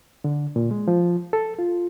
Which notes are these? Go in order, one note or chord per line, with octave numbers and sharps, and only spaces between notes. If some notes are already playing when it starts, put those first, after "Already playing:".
D3
A#2
G#3
F3
A4
F4